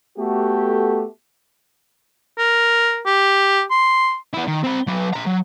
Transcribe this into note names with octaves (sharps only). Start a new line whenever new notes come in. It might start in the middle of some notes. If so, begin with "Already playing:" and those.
A3 B3 F#4 G4 A4
A#4
G4
C6
B3 E4
D#3
C4 B5
F#3 B4
C5 A#5
F#3